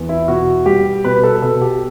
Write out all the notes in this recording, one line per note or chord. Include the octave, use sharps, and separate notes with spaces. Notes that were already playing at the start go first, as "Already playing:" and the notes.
Already playing: E2
E4
B2 F#4
G3 G4
B2 B4
A4
B2 A4
G4